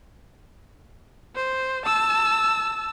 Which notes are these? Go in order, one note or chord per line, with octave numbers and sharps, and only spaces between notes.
C5
A5 E6